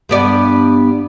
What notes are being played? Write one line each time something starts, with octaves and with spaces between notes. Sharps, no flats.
G2 B3 D5